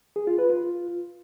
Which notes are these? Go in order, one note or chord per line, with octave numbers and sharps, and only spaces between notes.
G#4
F4
B4
F4